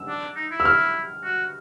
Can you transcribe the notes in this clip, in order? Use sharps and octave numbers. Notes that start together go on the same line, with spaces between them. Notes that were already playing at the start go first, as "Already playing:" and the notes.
Already playing: E6
D4
D#4
E4
E6
F6
F#4